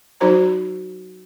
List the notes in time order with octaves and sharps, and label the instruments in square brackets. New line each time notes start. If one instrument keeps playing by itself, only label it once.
[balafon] F#3 D#4 F#4 C5 A#5